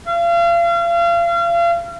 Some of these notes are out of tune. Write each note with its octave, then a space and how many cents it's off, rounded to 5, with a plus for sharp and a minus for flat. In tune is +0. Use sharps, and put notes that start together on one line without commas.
F5 -35